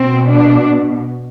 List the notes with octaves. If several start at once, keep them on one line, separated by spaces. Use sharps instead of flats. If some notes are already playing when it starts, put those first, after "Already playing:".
Already playing: B2 C4
D4